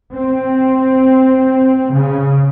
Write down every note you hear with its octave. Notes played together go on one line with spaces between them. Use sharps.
C4
C#3